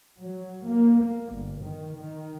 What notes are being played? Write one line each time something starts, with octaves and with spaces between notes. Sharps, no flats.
F#3
A#3
A#3
G1
D#3
D#3